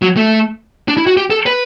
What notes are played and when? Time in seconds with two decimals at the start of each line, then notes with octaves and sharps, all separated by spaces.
0.02 F#3
0.17 A3
0.88 D4
0.97 E4
1.07 F#4
1.17 G4
1.30 A4
1.46 B4